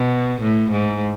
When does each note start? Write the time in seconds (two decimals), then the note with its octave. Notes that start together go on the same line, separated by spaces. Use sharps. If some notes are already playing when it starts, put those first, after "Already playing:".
Already playing: B2
0.41 A2
0.71 G#2